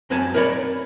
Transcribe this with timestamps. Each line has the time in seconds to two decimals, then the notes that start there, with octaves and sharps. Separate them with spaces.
0.10 F#2 C4 B4 C#5 G#5 A5
0.34 A#4 B4 C#5 D5 B5